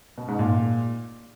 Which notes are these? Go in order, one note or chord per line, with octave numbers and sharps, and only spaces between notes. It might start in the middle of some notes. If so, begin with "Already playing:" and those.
B2
G#2
A#2